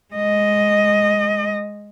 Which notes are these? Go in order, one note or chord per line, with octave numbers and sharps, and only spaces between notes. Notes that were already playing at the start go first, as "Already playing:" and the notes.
G#3 D#5